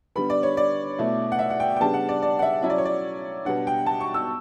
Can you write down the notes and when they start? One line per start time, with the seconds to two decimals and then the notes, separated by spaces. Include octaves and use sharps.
0.16 D3 G3 B3 B5
0.30 D5
0.43 C#5
0.57 D5
0.99 B2 A3 E4
1.32 F#5
1.39 E5
1.50 F#5
1.60 G5
1.76 G5
1.80 C#3 G3 B3 D4 A5
1.94 F#5
2.09 D5
2.22 D5
2.39 F#5
2.42 E5
2.63 F#3 C#4 E4 E5
2.70 D5
2.78 C#5
2.85 D5
3.45 B2 G3 B3 D4 F#5
3.67 G5
3.86 A5
4.01 C#6
4.14 E6